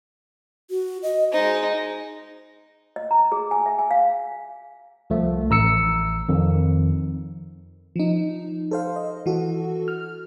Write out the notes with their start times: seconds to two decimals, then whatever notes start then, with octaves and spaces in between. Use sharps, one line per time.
0.71 F#4
1.03 D#5
1.32 G#3 D#4 C5
2.96 D#5
3.11 A#5
3.32 G#4
3.51 G#5
3.66 E5
3.79 G#5
3.91 F5
5.10 C2 F3 A3
5.50 A1 A#5 E6 C#7
6.29 F2 D#3
7.96 F3 D#4
8.71 A4 C5 F5
8.96 D#5
9.26 E3 F#4 A4
9.88 F6